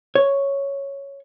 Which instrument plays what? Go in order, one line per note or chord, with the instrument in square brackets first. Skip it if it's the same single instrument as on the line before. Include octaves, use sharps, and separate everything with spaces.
[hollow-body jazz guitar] C#5